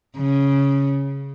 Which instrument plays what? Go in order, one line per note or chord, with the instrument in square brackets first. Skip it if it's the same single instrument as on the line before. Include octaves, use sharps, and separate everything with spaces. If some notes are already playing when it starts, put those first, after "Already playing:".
[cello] C#3